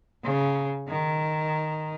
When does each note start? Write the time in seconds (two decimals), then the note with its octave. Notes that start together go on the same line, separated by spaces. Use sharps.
0.24 C#3
0.88 D#3